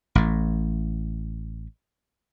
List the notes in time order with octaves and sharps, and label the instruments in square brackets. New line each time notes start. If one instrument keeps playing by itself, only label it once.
[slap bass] A1 A2